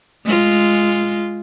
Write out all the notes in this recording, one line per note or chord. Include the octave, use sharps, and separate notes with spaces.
G#3 F4